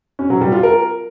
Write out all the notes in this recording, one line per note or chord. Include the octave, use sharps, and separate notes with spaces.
C#4
F#3
G3
F4
A#4